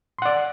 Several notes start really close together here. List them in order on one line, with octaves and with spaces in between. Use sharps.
C6 F#5 D5